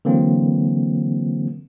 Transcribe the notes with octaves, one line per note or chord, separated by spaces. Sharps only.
D3 E3 F#3 A#3 C4